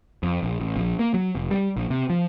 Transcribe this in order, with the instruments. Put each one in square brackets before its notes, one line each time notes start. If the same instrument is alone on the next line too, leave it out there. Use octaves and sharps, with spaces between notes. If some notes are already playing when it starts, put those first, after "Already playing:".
[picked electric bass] F2
A#1
A1
A#1
A#3
F#3
F1
G3
A#1
C3
F3